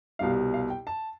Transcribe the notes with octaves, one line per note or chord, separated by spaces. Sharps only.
C2 B2 G3 F5
F5
G5
A5